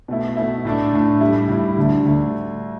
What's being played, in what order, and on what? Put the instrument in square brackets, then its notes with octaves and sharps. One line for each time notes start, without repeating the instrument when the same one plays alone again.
[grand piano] B2 A3 E4
B2 A3 E4
A2 A3 D4
A2 A3 D4
A2 G3 E4
A2 G3 E4
D2 D3 A3 D4
D2 D3 A3 D4